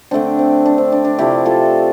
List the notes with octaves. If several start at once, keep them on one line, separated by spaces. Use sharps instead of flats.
D3 A3 C4 D4
C4
D4
C4
D4
D4
C3 F3 A3 E4 G4
F4 A4